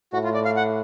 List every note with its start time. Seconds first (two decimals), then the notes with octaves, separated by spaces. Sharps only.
0.13 A2 F#4
0.24 F4
0.34 D5
0.45 F5
0.56 F#5